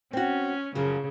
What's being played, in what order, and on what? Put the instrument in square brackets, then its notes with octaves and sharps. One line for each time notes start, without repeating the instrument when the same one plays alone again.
[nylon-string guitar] C4 F#4 [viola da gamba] C#4
[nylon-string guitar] F#2 F3 F#3 [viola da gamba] C#3